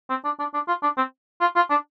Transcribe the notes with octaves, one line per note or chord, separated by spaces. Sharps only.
C4
D4
D4
D4
F4
D4
C4
F4
F4
D4